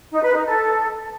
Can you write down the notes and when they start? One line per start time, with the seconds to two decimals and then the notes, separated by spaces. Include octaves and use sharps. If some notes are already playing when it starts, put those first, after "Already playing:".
0.11 D#4
0.23 B4
0.34 D#4
0.46 A4